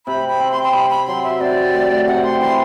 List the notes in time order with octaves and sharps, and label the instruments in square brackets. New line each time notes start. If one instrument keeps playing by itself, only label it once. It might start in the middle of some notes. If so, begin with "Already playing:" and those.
[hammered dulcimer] C3 [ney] B5
[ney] B5
[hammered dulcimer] C4
[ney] C6
C6
[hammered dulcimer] C3 [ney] B5
[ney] B5
[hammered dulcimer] F#3 [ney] C6
[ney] E5
[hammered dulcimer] C3 [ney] D5
[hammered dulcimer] A3
[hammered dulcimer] C3 [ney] F#5
[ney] C6
[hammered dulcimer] E3 [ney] C6